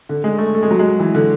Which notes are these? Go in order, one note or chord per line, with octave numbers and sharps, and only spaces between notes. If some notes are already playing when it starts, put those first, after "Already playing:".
D3
G#3
A3
A3
G#3
F#3
G#3
E3
D3